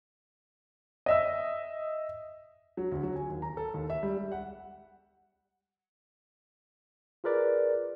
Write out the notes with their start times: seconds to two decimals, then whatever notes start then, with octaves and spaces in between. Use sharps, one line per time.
1.06 D#5 E5 E6
2.77 F#3
2.92 D2
3.03 F#3
3.15 G#5
3.29 D#2
3.42 A#5
3.57 A4
3.74 D#2
3.90 E5
4.03 G3
4.17 G3
4.32 F#5
7.24 F4 G#4 A#4 B4 D5